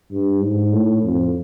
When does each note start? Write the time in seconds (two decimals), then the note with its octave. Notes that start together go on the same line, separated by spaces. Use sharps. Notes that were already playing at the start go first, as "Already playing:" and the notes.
0.11 G2
0.41 G#2
0.73 A2
1.03 F2